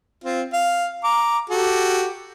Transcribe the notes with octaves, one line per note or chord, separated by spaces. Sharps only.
C4 F4
F5
A#5 D6
F#4 G4 A4